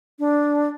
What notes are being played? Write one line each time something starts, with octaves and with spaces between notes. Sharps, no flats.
D4